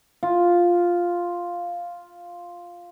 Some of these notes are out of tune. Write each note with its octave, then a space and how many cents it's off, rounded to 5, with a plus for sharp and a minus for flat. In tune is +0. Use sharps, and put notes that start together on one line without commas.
F4 +0